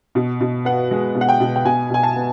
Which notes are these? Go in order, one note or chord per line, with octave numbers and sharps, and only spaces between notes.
B2
B2
B3 F#5
G#3
B2
F#5
G5
B2
G5
B2 G#5
B2 G#5
A5
B3